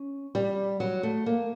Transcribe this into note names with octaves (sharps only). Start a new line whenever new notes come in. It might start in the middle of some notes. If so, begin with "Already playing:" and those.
Already playing: C#4
G3
F#3
A3
A#3